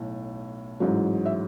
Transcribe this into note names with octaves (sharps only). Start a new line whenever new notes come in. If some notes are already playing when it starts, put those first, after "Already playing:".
Already playing: B1 A2
A1 G#2 F#3
E5